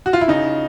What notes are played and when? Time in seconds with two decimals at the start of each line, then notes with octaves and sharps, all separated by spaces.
0.06 F#4
0.13 F4
0.21 E4
0.28 C#3 D#4